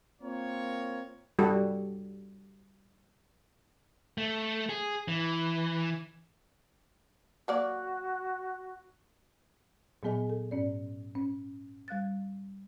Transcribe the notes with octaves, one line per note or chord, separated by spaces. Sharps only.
A#3 C4 F4 A#4 C#5
G3 F#4 A4
A3
G#4
E3
F#3 A#3 F#4 D5
A#2 F#3 B3 G#4 D#5 G#5
A4
G#2 C#4 D5
C#4
G3 F5 F#6 A6